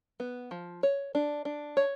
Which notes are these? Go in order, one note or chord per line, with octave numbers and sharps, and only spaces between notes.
B3
F3
C#5
D4
D4
C#5